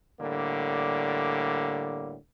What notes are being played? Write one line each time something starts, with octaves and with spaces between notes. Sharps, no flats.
A2 D3 G3 A#3